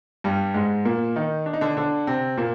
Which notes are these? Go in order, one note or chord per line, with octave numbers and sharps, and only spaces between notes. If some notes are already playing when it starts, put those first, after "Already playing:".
G2 G3
G#2 G#3
A#2 A#3
D#3 D#4
D4
D#4
D3 D4
D3 D4
C3 C4
A#2 A#3